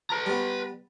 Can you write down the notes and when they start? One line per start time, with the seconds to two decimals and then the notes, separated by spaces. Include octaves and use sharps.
0.10 B4 A#5
0.26 G3 B3